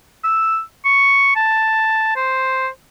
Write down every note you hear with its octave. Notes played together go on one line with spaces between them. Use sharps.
E6
C#6
A5
C5